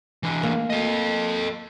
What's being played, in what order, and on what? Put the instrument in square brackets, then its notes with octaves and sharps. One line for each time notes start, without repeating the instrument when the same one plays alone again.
[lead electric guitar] E3 D4
[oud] A#3
[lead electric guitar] A4 D#5